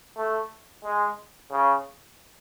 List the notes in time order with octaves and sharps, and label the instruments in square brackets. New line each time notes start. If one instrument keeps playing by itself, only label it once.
[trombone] A3
G#3
C#3